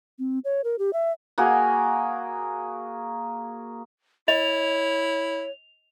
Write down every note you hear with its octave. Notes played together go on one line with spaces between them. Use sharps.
C4
C#5
A#4
G4
E5
A#3 F#4 G#4
E4 C#5 D#5 F7